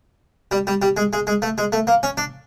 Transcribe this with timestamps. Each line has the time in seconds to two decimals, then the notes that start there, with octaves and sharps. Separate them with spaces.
0.51 G3
0.67 G3
0.82 G3
0.97 G#3
1.13 G#3
1.27 G#3
1.42 A3
1.58 G#3
1.72 A3
1.87 A#3
2.03 C#4
2.17 D4